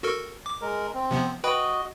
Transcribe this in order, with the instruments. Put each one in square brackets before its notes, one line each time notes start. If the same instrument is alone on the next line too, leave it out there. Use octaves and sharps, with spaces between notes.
[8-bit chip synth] F#4 A4 A#4
D6
[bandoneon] G#3 A#4
C4
[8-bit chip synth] C3 F3 B3
[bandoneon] F#4 D#5 [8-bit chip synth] B4 G5 B5